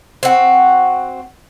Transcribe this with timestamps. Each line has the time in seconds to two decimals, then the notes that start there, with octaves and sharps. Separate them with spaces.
0.23 C4 F#4